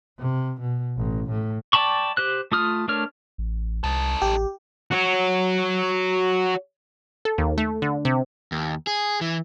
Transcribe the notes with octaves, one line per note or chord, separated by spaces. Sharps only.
C3
B2
A1
A2
D5 G5 A5 B5 C#6
G4 C5 F#6
A3 F4 D#6 F6
A3 D4 A#4 C#5 F6
A1
C2 D#4 A4
A1 G4
F#4 C#5
A4
D#2
A3
D3
C3
D#2
G#4
E3